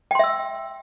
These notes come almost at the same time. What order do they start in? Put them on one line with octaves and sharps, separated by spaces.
G5 C6 E5 E6